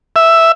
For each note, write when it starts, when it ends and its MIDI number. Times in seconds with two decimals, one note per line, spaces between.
0.16 0.52 76